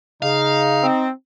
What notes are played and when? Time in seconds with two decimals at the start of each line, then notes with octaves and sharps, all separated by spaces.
0.22 C#3 D#4 F5
0.83 C4